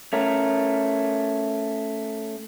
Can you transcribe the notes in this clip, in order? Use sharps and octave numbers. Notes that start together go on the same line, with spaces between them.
A3 C#4 A#4